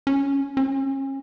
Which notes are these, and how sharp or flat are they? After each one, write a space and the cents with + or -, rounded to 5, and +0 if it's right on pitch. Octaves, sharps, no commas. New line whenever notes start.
C#4 +5
C#4 -35